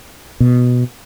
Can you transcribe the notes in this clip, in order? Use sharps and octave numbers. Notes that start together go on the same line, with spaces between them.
B2